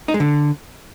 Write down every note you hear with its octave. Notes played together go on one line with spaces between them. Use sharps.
D#4
G#3
D3